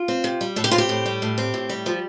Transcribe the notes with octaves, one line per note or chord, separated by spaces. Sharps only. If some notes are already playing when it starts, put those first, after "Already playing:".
Already playing: F4
C4
C3
G3
A2 A4
G4
C4 F4
G4
A2
G3
A2
C4
A2
G3
F3